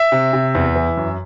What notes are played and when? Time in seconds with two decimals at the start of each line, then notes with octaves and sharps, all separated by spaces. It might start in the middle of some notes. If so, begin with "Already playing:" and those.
Already playing: E5
0.12 C3
0.33 C3
0.55 E2
0.76 E3
0.97 F#2